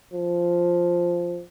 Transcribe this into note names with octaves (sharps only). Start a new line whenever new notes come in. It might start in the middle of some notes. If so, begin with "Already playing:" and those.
F3